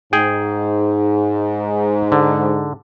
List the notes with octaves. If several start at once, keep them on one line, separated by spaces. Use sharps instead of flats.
G#2 G#4 G5
D3